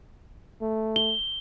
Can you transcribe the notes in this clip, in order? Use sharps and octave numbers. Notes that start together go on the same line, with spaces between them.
A3
G7